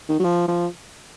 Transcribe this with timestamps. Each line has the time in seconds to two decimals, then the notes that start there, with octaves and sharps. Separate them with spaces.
0.09 D#3
0.20 F#3
0.24 F3
0.48 F3